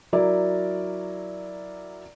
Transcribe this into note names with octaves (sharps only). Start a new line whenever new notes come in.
F#3 E4 A#4 D5